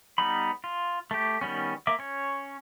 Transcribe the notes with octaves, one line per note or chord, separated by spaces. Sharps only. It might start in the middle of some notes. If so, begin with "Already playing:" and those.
G3 B3 D#4 B5
F4
A3 G4
D#3 G3 B3 C#4
A#3 E5 D6
C#4 C#5